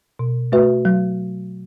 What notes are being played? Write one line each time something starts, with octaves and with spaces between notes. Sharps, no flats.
B2
A3 F#4 B4 E5
F#3